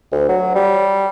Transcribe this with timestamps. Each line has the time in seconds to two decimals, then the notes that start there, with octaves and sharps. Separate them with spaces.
0.12 D2
0.29 F#3
0.55 G3